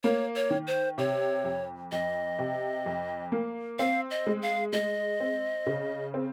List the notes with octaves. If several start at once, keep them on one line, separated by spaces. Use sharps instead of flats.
A#3 C#5
C#5
D#3
C5
C3 C#5
F2
F2 D#5
C3
F2
A#3
C4 F5
D#5
G#3
F5
G#3 D#5
C4
C#3
C4